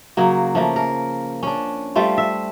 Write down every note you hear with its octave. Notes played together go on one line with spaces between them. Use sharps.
C#3 F#3 A#3
F3 A3 A#3
A#4
C#4 D4
G3 A3 F4 C5
E5